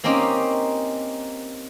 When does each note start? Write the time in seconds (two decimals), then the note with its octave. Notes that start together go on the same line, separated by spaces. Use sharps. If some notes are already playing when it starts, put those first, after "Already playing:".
0.04 A#3 C4 C#4 D#4 G4